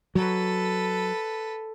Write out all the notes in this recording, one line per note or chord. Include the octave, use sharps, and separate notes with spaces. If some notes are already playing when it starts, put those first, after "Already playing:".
F#3 A4 B4